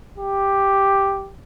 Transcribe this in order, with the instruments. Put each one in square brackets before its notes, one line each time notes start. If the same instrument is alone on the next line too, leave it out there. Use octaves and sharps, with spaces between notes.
[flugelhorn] G4